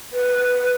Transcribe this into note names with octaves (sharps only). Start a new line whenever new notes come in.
B4